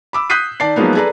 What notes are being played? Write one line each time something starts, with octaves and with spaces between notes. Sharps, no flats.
B5 D6 E6
D#6 F#6 G6 B6 C7 D#7
D#3 D5 A5 C7
F3 F#3 G#3 A#3 B3 D#4
G#4 A4 B4 D5 A#5